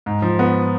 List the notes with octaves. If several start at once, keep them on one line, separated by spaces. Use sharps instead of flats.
G#2
F3
B3